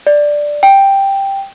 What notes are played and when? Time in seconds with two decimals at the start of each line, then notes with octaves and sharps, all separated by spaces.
0.07 D5
0.63 G5